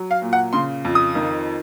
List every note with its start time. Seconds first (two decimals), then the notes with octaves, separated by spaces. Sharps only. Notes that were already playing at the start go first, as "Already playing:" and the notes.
Already playing: F#3
0.11 F5
0.22 A#2
0.33 F#5
0.53 C#3 C6
0.85 F2
0.95 D#6
1.15 D#3